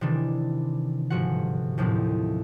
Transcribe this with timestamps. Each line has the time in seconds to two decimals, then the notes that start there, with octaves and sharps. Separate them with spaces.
0.01 C3 D#3 E3 D4
1.10 G1 G#2 F3 F#4 F#5
1.78 D#2 A2 C3 F3 F#3 C4